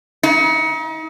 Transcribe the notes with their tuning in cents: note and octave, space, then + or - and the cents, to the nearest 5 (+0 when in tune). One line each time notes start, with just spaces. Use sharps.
D#4 +40